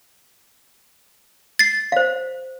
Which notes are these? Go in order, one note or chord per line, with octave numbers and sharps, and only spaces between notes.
A6 C7
C5 F5